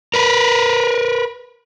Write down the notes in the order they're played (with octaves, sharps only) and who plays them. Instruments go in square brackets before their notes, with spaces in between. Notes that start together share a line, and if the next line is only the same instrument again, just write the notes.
[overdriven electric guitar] A#4 B4